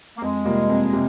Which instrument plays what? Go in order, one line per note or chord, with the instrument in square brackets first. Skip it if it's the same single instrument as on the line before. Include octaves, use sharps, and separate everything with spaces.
[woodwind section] A#3
[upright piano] F2 [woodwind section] G#3
[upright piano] C3 G3 A#3 F4
F2
C3